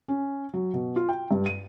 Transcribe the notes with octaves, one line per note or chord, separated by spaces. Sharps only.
C#4
F#3
B2
F4
G5
G2
D#7